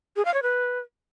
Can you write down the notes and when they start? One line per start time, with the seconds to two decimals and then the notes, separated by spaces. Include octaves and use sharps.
0.16 G#4
0.25 F5
0.34 C#5
0.43 B4